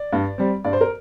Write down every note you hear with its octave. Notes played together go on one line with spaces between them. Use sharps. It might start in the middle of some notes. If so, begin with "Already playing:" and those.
Already playing: D5
G2
G3 C4
G2 D5
C5
A#4